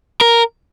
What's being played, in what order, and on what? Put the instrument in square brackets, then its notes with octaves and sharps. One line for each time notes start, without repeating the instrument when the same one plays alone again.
[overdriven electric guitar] A#4